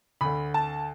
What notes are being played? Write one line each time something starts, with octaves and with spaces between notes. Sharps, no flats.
D2 D3 B5
A5